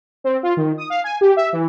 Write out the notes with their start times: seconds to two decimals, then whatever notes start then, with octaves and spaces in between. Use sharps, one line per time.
0.24 C4
0.43 F4
0.57 D#3
0.78 D#6
0.90 F5
1.04 G#5
1.21 G4
1.37 E5
1.53 E3